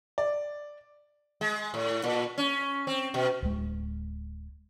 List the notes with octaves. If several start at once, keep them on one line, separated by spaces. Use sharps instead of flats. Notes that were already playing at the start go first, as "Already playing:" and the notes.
D5
G#3
A2
A#2
C#4
C4
B2
D1 G#3